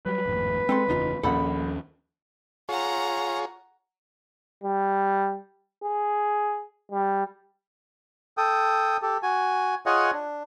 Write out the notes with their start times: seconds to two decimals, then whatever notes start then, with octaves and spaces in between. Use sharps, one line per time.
0.06 F#3 G3 B4
0.26 G#1 F2 A2
0.69 G#3 C4 A4 C6
0.89 F#1 E2 C#3 B3 D#4 F4
1.23 A#1 D#2 F3 C#4 A4 F#5 B5
2.69 F4 G#4 C#5 F#5 A#5
4.64 G3
5.84 G#4
6.92 G3
8.37 A4 G5 D#6
9.02 G4 A4
9.23 F#4 G#5
9.86 F4 G#4 C#5 D#5 F#5 G#5
10.13 D4